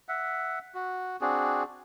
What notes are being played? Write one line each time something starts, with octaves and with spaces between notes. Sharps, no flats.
E5 F#5
F#4
C4 D4 F#4 G#4